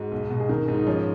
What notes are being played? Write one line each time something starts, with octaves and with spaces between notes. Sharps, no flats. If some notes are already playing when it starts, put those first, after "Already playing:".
Already playing: G#2 F#4
B1
B2
G#4
D#3 A#4
G#2
D#4
F3 C#4